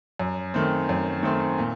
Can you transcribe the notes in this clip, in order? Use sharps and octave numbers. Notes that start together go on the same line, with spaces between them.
F#2
D#3 A3 C4
F#2
D#3 A3 C4
A#2